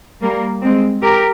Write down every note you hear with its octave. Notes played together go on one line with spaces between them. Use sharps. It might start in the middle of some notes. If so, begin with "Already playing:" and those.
G3 A#3
G#3 C4
G4 A#4